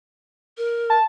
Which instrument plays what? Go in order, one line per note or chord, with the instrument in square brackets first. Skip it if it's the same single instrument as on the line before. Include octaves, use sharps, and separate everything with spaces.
[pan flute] A#4
[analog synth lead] A5